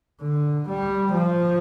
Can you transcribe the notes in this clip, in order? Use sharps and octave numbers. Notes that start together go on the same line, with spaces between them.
D3
G3
F3